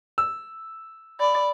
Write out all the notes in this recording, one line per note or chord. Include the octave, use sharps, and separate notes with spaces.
E6
D5 B5